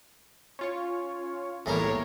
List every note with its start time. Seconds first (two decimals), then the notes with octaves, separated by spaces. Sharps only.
0.59 C#4 F4 C#5
1.66 B1 E2 A2 G3 G#3 A#3 A#4 C#5